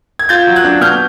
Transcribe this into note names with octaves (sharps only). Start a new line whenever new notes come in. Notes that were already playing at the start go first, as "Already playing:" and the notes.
G#6
F4 G6 A6
F#3
F#6 G#6
D4
B2 F6 G6